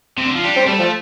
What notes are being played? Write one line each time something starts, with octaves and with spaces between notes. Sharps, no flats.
C3
D3
F3
G3 D4
C4
G3 A3
F3